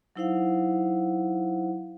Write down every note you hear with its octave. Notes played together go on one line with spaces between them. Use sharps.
F#3 D#4 E4 C5 F5 F#5